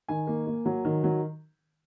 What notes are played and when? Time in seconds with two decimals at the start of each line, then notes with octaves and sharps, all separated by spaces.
0.08 D#3 G#5
0.27 A#3
0.47 A#3
0.65 F#3
0.85 D#3
1.04 F#3